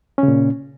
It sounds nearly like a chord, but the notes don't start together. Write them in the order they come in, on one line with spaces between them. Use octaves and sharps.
C#4 C#3 A#2